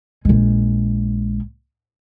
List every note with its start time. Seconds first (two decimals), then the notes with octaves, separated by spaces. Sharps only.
0.25 A#1 G#3